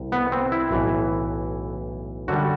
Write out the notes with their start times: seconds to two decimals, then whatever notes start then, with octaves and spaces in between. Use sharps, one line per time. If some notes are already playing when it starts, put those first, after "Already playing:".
Already playing: C2
0.12 B3
0.32 C4
0.52 E4
0.71 B1 A2 E3
2.28 F#2 D3 G3 F#4